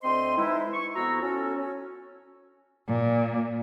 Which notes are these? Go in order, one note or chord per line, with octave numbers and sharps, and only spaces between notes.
D2 C4 C5 D#5 C6
E3 G#3 D#4 E4
C#6
F2 B3 E4 F#4 A#5 E6
C#4 F#4 A4
C#4
A#2